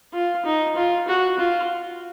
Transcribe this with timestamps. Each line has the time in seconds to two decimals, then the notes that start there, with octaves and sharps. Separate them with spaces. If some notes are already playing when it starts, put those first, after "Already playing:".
0.13 F4
0.45 D#4
0.76 F4
1.08 F#4
1.38 F4